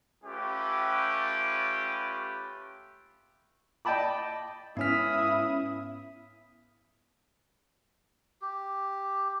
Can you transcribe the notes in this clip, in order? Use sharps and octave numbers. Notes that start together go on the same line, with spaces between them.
A3 C#4 F4 G4 B4
D5 D#5 G5 A5 B5 D6
G#2 B3 C#4 E4 D#6 F6 B6
G4